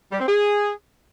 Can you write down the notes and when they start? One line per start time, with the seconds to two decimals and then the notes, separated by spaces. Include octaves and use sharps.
0.12 G3
0.20 C4
0.28 G#4